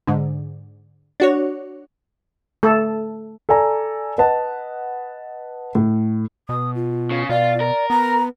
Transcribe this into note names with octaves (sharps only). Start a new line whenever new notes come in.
G#2 D3
D4 F#4 C#5
A3 A4
A4 D5 G#5 A#5
B4 D#5 F#5 A5
A2
B2 D#6
F4
C#3
B2 F4 D5
A#4
B3 A#5